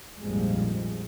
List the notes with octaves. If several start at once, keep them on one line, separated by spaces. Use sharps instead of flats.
A#1 F2 G#2 F3 G3 G#3